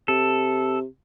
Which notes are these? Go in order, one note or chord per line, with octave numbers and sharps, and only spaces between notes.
C3 A4